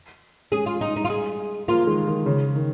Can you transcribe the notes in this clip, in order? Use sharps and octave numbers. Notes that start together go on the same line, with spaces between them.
G#3 C#4 G#4
F4
D#4
D#4
F4
G#4
F3 A#3 F4
D#3 G#3
D#3
C#3
D#3